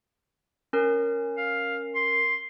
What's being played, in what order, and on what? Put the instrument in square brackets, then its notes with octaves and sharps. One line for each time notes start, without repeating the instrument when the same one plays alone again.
[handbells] C#4 A#4
[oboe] F5
C6